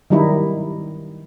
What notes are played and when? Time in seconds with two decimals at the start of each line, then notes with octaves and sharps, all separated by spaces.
0.10 D#3 F#3 G3 D#4 E4